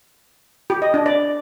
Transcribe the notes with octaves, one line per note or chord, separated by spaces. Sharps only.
G4
D#5
D4
D5